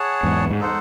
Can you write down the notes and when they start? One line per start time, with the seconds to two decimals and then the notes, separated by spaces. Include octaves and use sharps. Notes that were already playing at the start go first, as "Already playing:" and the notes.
Already playing: G#4 C#5 F#5 A5
0.23 E2 G#2
0.51 G#2
0.59 D#4 A4 C5 F#5